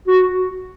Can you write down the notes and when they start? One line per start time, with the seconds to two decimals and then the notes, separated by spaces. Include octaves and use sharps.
0.08 F#4